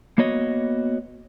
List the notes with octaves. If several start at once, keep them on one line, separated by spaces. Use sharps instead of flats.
A#3 B3 F#4 C#5 D#5